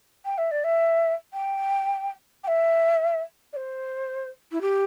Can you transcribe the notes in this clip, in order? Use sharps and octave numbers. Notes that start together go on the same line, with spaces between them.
G5
E5
D5
E5
G5
G5
E5
D5
C5
E4
G4